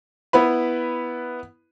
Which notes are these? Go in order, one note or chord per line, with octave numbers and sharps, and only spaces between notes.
B3 E4 B4 B5